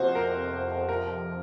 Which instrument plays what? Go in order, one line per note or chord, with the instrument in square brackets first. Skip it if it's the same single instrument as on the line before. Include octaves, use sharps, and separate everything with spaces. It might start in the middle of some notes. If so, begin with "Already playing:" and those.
Already playing: [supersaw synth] F2 C3 F3 [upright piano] F#4 C5
[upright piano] A#4
A#4